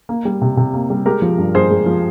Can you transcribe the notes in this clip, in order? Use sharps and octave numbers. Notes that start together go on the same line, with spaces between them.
A#3
G3
C3
C3
A#3
G3
G#3 G4 A#4
F3
G2
G2 G#4 C5
G#3
F3